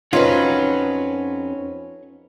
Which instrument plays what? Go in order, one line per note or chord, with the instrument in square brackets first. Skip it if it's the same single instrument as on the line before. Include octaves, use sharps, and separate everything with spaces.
[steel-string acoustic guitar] F2 C#4 B4 [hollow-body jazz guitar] D#4 F4 [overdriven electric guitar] C#5 F#5